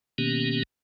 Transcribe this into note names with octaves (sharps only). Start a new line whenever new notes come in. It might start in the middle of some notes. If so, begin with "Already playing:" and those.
B2 D#3 A#3 B3 C#4 G4